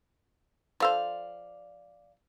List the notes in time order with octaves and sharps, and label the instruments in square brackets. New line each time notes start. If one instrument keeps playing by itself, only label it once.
[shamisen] F3 A4 C5 [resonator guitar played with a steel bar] D5 F5